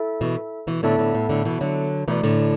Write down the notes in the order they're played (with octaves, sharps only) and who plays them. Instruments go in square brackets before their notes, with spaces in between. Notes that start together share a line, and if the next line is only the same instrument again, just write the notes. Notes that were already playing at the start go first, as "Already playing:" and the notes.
Already playing: [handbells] E4 A4 E5
[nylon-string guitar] B2 E3
B2 E3
[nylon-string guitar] A2 D3 [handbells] B3 E4 A4 E5 A5
[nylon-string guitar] A2 D3
A2
A2 D3
B2 E3
D3 F#3
[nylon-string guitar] B2 E3 [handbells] A3 E4 D5
[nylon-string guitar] A2 D3